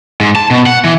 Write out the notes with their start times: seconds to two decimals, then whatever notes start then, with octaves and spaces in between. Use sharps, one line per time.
0.21 G#2
0.35 A5
0.51 B2
0.66 F#5
0.84 E3